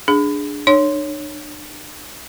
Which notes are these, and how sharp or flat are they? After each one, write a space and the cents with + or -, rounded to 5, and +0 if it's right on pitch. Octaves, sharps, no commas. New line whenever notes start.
D4 +0 G#4 +0
D4 +45 C#5 +0